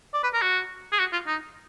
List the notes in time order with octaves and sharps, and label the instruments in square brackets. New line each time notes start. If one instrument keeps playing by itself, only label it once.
[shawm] D5
B4
A#4
F#4
G#4
F#4
F4
D#4